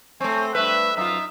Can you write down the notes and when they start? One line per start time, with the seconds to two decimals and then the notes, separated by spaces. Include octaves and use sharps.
0.21 A3 C4 C#5 G#5
0.55 G2 A3 B4 E5
0.97 F#2 D#4 F4 E5